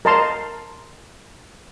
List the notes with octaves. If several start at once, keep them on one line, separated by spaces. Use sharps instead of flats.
A#4 D#5 A5 A#5 C6